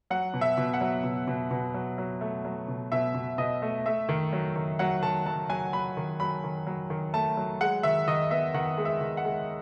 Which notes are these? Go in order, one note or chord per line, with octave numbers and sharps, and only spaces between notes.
F#3 F#5
B2
E5
B2
F#5
F#3
B2
B2
B2
F#3
F#3
A3
F#3
B2
B2 E5
B2
B2 D#5
A3
A3 E5
D#3
F#3
D#3
F#3 F#5
D#3 A5
F#3 A5
F#3 G#5
F#3 B5
D#3
F#3 B5
D#3
F#3
D#3
A3 A5
F#3
G#3 F#5
D#3 E5
D#3 D#5
B3 E5
D#3 F#5
G#3
E5
D#3
F#5
G#3